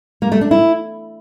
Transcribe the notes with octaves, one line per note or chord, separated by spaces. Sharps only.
A#3
A3
D4
E4